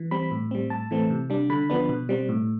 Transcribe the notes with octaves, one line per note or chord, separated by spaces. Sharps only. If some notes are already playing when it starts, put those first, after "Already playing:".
Already playing: E3
G3 C4 B5
A2
G3 C4
A2 A5
E3 A3 C4
C3
G3 D4
D3 B5
F3 B3 D4
B2
G3 C4
A2